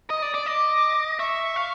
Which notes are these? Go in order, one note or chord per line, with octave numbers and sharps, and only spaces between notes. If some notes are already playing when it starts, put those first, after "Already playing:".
D#5 D#6
D5
D5
D#5 D6
E5 C#6
F5